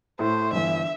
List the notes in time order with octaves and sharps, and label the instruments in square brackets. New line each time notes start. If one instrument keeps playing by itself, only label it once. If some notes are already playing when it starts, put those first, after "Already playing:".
[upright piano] A2 A3 E4 [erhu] C5
[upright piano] G1 G2 E3 [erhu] E5